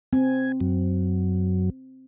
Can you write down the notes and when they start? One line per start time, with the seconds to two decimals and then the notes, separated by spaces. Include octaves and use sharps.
0.13 C4 G#5
0.60 F#2 F#3